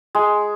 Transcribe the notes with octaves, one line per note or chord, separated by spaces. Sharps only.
G#3